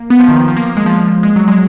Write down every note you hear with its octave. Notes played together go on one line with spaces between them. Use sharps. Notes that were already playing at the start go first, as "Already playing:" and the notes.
Already playing: A#3
B3
F3
D#3
D#3
F3
A#3
A#3
G#3
F3
G#3
F#3
G#3